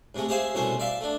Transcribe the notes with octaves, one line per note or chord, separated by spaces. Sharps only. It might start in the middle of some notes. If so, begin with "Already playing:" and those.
G#2 C3 G#3 A3
G4 G#4 C5 E5 F5 G#5
C2 B2 A3 C#4 C5
D5 E5 F5 C6
A3 D4